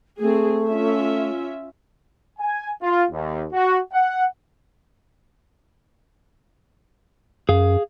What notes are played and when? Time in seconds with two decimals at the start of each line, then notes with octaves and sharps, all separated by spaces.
0.19 A3 C4 G#4
0.66 C#4 F4 E5
2.39 G#5
2.82 F4
3.11 D#2
3.53 F#4
3.93 F#5
7.49 F#2 G#4 F5